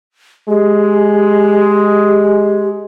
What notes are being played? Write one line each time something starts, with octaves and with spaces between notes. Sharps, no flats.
G#3 G4